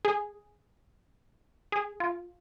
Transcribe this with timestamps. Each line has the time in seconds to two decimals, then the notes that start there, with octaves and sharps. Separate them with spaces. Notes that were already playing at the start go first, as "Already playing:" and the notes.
0.05 G#4
1.72 G#4
2.00 F4